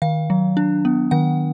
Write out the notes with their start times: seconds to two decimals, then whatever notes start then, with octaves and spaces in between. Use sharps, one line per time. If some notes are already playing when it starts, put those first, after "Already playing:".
0.02 D#3 F5
0.30 F#3
0.57 D4
0.85 B3
1.11 D#3 F#5